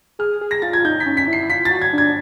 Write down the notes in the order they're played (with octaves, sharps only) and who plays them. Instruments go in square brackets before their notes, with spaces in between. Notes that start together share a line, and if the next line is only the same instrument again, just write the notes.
[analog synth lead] G#4 [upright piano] F6
[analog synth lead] G#4
[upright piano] A#6
[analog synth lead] F4 [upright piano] A6
[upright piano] G#6
[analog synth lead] D#4 [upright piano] G6
[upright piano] B6
[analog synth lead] C#4
[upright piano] B6
[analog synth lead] E4
[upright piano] C7
[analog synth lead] E4
[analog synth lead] F4 [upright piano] B6
[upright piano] A6
[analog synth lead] F#4
[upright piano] G#6
[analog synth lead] D4 [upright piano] G#6